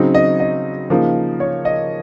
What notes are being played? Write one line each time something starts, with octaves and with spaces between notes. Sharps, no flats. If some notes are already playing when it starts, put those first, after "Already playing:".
Already playing: C#3 F#3 C4 D#4
D#5
D#5
C#3 F3 A#3 D#4
C#5
D#5